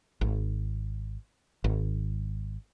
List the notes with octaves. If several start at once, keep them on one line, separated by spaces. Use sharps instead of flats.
G#1
G#1